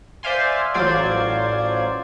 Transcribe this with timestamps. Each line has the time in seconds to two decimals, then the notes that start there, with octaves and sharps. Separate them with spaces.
0.23 C5 D5 E5 F5 G#5 C6
0.74 A1 F#3 F4 C5 D5 G#6